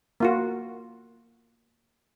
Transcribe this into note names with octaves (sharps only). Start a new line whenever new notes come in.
A#3 F4 F#4